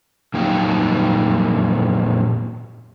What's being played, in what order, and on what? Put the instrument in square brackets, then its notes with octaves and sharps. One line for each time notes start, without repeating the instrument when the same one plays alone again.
[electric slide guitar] F2 A#2 F#3 D#4 G4 G5